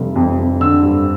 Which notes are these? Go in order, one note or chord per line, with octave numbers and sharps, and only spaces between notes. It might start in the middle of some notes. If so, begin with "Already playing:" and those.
Already playing: F1 G3
F2
F2
D3 E6
G2